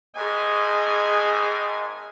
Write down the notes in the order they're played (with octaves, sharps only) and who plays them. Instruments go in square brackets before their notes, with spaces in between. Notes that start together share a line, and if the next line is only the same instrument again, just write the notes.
[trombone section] G#1 G#2 [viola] G#4 G#5 [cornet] D#5